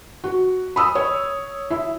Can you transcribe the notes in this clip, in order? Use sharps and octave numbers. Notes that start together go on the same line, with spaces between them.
F#4
B5 D#6 E6
C#5
E4 E5